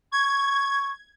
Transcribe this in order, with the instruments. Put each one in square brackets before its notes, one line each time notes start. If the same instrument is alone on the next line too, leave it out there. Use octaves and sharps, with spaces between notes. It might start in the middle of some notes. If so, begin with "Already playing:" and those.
[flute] C#6 [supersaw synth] G#6